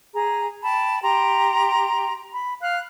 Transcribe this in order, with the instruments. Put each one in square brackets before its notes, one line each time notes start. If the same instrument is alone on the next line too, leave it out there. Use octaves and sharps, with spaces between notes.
[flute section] G#4 A#5
G5 A5 B5
G4 A#5 C6
B5
F5 F#6